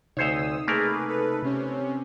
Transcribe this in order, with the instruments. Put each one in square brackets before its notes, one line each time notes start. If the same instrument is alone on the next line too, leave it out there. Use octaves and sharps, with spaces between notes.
[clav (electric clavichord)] D2 C5 C#5 [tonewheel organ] C3 D#4 [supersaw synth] D#6 E6
[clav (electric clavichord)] A3 A#3 A#4 [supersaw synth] G#4 B4
[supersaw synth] A4 B4
C3 C#4